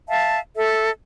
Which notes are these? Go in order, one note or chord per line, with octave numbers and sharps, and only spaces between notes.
E5 F5 A5
A4 E5